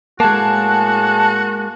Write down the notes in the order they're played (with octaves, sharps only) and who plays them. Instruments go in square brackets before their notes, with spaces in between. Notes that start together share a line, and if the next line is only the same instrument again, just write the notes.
[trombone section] A2 G#4 [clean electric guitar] G#3 A#3 [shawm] F#4 [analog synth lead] A5